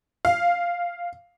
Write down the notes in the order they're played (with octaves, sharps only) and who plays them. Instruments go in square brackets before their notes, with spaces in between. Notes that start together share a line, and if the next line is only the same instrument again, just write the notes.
[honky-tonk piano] F5